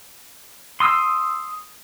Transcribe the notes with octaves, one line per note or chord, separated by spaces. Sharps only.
C6 D#6 E6